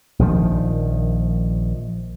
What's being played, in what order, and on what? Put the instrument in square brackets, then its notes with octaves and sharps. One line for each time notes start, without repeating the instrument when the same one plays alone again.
[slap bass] A#1 D#3 F3